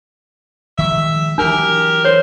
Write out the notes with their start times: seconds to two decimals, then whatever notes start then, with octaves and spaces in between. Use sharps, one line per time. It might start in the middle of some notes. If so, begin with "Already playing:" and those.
0.79 D#3 F3 G#3 E5
1.38 E3 F#3 D4 G4 A#4
2.05 G2 C5 C#5